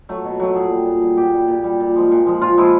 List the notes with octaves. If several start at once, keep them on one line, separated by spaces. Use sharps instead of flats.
F#3 A3
B2
F#3 A3
A#2 G#4
G3
A#2
G3
A#2 G4
G3
A#2
G3
A#2
F3 G#3
A#2
F3 G#3
A#2 F4
F3 G#3 E4